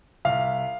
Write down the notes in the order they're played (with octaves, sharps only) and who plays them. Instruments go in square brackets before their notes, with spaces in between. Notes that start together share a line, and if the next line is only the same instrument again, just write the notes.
[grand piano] C2 F5